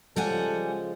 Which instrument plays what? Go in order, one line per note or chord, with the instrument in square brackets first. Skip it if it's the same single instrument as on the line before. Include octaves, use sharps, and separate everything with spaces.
[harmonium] C#3 F3 G#3 [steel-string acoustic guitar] G3 F#5 G#5 [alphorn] A4